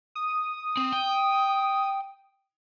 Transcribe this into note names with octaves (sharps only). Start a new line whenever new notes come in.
D#6
C4
G5